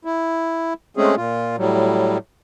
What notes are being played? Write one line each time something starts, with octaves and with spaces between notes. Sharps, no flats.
E4
G#3 A3 C4 C#4 G#4
A#2 F4
A2 F#3 G3